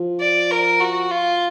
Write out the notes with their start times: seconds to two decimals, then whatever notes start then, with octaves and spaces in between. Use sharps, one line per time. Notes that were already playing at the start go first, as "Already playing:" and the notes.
Already playing: F3
0.21 D5
0.51 A#4
0.81 F#4
1.11 F4